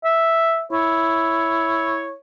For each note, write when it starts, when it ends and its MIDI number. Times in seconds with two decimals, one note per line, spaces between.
0.04 0.63 76
0.72 2.13 64
0.72 2.18 73